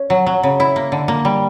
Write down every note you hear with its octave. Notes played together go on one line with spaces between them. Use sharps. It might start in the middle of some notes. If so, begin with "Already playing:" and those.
Already playing: C#4
F#3
F#3
C#3
E4
A#3
D3
A#3
G3